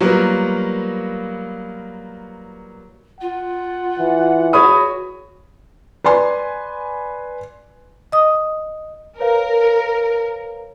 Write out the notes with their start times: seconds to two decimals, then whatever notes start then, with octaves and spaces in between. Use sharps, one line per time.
0.01 F#3 G3 A#3 B3 F4 A#4
3.21 F4 F#5
4.00 E3
4.53 F#4 G#4 C#5 B5 D#6
6.04 B4 D5 G#5 C6
8.12 D#5 D#6
9.19 A#4 B4 C#5 F5